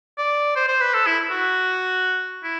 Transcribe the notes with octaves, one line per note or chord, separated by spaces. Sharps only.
D5
C5
C5
B4
A4
E4
F#4
E4